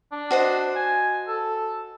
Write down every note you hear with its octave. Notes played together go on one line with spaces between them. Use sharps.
D4
F#4 C5 D#5
G#5
A4